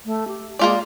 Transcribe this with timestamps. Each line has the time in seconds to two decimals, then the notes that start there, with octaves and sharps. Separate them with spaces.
0.06 A3
0.28 G4
0.59 G#3 A#3 F4 D5